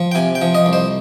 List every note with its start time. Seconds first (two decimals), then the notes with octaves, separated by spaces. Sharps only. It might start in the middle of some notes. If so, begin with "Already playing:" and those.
Already playing: F3
0.12 G5
0.15 C3 G#5
0.35 G5
0.42 F3
0.55 D#5
0.66 C2
0.73 C5